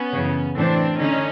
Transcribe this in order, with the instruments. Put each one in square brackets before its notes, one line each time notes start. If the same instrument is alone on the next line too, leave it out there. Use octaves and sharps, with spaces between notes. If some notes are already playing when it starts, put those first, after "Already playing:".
Already playing: [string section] B3 C#4
F#2 C#3 E3
A2 E3 C4 D4
D3 C#4 D#4